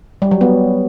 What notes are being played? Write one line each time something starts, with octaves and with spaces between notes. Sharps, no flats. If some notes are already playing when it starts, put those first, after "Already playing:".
G3
F#3
B3